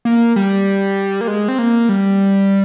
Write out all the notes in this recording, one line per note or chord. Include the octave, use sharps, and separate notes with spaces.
A#3
G3
A#3
G#3
C4
A#3
G3